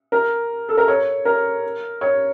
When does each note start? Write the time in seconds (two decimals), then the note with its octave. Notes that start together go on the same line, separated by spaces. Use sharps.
0.12 A#4
0.69 A4
0.77 A#4
0.88 C#5
1.25 A#4
2.01 C#5